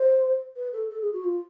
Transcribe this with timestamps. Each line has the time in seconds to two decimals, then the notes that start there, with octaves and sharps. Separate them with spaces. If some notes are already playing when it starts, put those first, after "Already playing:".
Already playing: C5
0.56 B4
0.73 A4
0.90 A4
1.01 G#4
1.13 F#4
1.24 F4